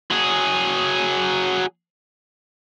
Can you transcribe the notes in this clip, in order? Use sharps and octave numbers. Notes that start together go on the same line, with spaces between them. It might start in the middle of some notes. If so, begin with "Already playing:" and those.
F#3 G#4